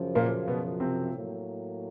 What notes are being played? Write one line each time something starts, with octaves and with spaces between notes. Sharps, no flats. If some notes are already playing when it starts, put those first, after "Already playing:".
Already playing: F#2 C#3 F3
A#2 A#3
B2 B3
C3 C4
A2 F#3 A#3